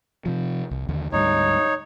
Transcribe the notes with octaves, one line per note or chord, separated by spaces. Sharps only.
C3 F3
C2
D#2 D3
D2 G#2 G3 D#4 C#5